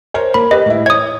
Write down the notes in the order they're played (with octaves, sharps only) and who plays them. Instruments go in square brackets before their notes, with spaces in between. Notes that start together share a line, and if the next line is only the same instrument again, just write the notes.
[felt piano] A#4 C5 C#5
[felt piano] A#3 [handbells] B5
[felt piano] G4 B4 [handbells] D#5
[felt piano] A2 E4
[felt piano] C#5 [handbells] D#6 G#6